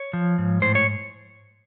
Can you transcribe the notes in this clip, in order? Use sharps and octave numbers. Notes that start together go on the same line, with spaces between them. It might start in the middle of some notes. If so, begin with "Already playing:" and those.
Already playing: C#5
F3
G#2
A2 C5
C#5